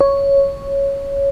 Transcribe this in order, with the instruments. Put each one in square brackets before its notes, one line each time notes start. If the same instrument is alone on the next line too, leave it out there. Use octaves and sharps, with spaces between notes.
[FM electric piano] C#5